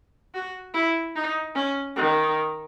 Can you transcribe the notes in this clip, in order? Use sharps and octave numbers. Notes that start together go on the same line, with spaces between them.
F#4
E4
D#4
C#4
D#3